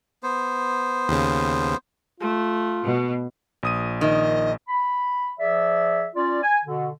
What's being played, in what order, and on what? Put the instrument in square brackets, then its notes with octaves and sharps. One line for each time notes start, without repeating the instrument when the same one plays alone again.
[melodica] B3 C5
[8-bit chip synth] D#2 C#3
[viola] A3 [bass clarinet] F4
[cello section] B2
[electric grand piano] A#1 D#6 D#7
[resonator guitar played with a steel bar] D#3 [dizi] D#5
[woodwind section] B5
F3 G#4 D5 E5
C#4 F4 D5
G#5
B2 D3